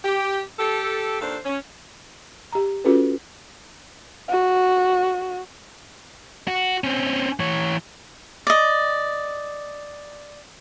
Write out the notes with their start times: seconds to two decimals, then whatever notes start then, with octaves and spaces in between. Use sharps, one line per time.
0.05 G4
0.59 G4 A4
1.21 D#2 D4 F4 A4 C5
1.45 C#4
2.52 G4 A#5
2.84 C#4 F4 F#4 G#4 A4 B4
4.29 F#4
6.48 F#4
6.84 C4 C#4
7.40 E3 C#5
8.47 D5 D#5